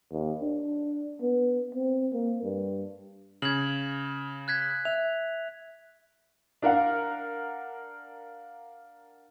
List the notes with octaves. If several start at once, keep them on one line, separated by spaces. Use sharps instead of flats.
D#2
D4
B3
C4
A#3
G2
C#3 G#6 F#7
F#6 G#6 B6
E5 F7
D4 A#4 F5 F#5